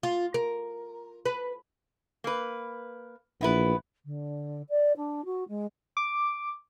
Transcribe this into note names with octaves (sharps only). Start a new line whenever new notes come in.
F4
A#4
B4
A#3 B4
A#1 B3 E4 B4
D3
D5
D4
F#4
G#3
D6